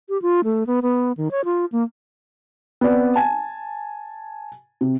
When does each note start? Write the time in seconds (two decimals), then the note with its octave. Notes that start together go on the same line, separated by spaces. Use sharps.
0.09 G4
0.22 F4
0.44 A3
0.67 B3
0.82 B3
1.17 D#3
1.31 C#5
1.45 F4
1.72 A#3
2.81 B3 C4 D5
3.16 G#5 A5
4.81 C3